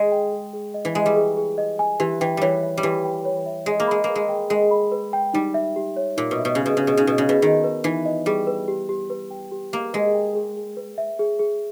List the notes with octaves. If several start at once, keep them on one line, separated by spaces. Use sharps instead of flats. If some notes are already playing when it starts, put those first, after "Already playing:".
Already playing: G#3 D#5
G5
G#4
G#4
D#5
E3
G#3 G#5
G3
G#4
G#4
D#5
G#5
E3 G4
E3 G5
E3 G3 C#5
E5
G3
E3 G4
G5
C#5
E5
G#3 G#4
A#3
G#3 B5
A#3 B4
G#3
G5
G#3 G#4
B5
B4
G5
G3 D#4
E5
G4
C#5
A#2 D#4
B2
E5
B2
C#3 G4
B2
C#3 C#5
B2
C#3 D#4
B2
C#3 D#5
B2
D#3 G#4
B4
E3 D#4
D#5
G3 G#4
B4
G4
G4
B4
G5
G4
A#3 G4
G#3 B4
G5
G#4
G#4
B4
E5
G#4
G#4